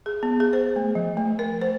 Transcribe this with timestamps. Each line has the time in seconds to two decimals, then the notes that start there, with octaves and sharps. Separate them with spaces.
0.06 G#4
0.23 B3
0.40 G#4
0.53 C5
0.76 A3
0.95 F3
1.17 A3
1.39 A#4
1.61 C5